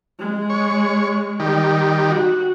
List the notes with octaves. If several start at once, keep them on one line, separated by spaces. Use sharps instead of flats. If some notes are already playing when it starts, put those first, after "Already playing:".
G#3
C#5
D#3 G3
F#4